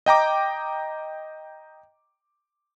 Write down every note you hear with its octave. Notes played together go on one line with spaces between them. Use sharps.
D#5 G5 A#5 D6